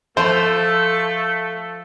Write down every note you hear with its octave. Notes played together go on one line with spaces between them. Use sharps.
F3 A3 A4 C5